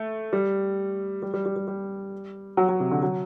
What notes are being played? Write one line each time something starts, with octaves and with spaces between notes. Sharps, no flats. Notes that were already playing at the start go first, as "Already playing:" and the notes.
Already playing: A3
G3
G3
G3
G3
G3
G3
F#3
F#3
C3
D3
F#3